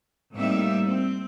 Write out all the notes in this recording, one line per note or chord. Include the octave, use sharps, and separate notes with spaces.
A2 G3 A#3 C4 D#4 E5
C4